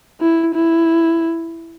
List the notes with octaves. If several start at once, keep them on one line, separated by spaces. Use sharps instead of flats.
E4
E4